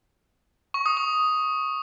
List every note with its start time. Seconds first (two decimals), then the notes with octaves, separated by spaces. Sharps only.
0.74 C#6
0.86 D#6
0.97 C#6